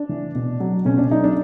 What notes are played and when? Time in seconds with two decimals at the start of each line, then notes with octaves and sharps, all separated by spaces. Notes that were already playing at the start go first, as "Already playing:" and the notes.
Already playing: D4
0.09 E3
0.35 B2
0.60 F#3
0.85 B2 C#4
0.98 D4
1.11 F#3 D#4
1.24 D4